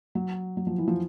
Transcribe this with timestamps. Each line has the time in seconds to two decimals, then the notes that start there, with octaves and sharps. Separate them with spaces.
0.15 F#3
0.57 F#3
0.67 F3
0.78 E3
0.88 F3